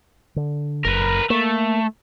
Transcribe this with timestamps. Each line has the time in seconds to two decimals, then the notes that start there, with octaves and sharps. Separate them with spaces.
0.36 D3
0.85 F#1 A#4 B4
1.30 A3 A#3